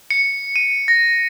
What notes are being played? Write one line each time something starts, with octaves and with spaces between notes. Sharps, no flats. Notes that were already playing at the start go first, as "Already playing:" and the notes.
C#7
D#7
A#6